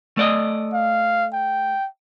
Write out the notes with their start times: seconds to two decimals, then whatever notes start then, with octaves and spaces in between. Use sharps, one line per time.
0.17 A3 D5 D#5
0.73 F5
1.33 G5